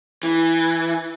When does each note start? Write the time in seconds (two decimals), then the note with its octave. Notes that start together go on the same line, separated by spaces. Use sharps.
0.23 E3